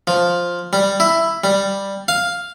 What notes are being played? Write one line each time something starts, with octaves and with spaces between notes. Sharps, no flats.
F3
G3
E4
G3
F5